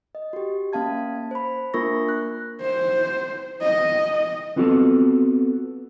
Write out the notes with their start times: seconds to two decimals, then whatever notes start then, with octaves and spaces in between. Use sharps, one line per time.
0.15 D#5
0.33 F#4 G4
0.73 A#3 C#4 F5 A5 G#6
1.31 C5 B5
1.74 A#3 D4 F4 A#4 C#6 A#6
2.09 F#6
2.62 C5
3.62 D#5
4.56 B3 C4 F4 F#4 A4